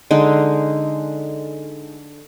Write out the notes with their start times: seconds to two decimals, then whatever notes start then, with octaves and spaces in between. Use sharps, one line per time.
0.11 D3 G#3 D#4